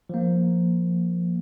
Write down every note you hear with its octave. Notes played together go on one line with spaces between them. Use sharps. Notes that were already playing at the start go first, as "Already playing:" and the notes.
F3 A#3